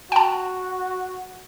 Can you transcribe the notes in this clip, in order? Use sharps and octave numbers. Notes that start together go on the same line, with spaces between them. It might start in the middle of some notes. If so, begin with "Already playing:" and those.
F#4 G5 A5